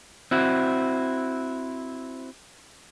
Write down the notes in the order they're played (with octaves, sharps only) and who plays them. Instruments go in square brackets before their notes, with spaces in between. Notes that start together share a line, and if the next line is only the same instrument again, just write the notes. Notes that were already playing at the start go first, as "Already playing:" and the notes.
[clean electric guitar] C4 E4 F#4